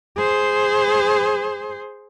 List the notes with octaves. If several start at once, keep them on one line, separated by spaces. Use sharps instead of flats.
G#4 C5